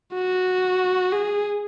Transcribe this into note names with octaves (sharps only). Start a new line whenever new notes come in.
F#4
G#4